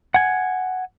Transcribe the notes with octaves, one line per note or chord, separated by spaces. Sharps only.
F#5 G#5